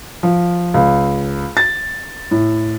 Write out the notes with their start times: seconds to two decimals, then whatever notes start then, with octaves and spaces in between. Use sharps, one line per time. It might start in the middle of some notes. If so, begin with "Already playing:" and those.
0.23 F3
0.74 C#2
1.57 A6
2.31 A2